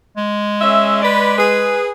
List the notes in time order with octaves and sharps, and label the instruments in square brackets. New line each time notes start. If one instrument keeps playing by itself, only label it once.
[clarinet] G#3
[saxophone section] C#4 G#4 E5
B4 D5
G#4 B4